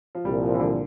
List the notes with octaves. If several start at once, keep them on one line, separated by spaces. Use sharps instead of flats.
F3
C2 A#2 F3 G3
E3
D3